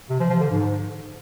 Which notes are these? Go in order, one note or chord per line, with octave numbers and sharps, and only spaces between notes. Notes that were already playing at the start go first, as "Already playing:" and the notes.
C3
F3
F3
D3
G#2